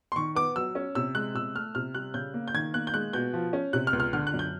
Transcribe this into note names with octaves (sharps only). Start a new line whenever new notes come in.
C6
D#3 C#6
B3 D6
F#3 E6
C#4
C3 E6
G#3 F#6
C3 E6
A3 F6
C3 F6
G3 F#6
C#3 G6
A#3
G6
D#3 G#6
A#3 F#6
G6
G#3 F#6
B2 G6
F3
C#4
C3 F#6
F6
C#2
F6
D3 F6
F#6
F#2
G6